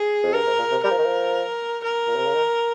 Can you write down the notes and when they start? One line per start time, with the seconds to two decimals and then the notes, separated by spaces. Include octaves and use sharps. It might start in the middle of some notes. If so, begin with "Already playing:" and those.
Already playing: G#4
0.23 F2
0.33 G2 A#4
0.46 G#2
0.58 A#2
0.71 C3
0.84 G3 A#4
0.91 F3
0.98 D#3
1.05 F3
1.84 A#4
2.07 A#2
2.16 C3
2.25 C#3
2.34 D#3